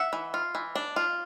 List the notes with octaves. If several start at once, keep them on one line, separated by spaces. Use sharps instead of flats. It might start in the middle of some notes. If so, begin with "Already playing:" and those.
Already playing: E5 F#5
E3
F4
E3
D4
F4